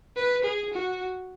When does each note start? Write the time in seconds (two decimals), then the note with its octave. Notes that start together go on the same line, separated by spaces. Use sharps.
0.16 B4
0.44 G#4
0.73 F#4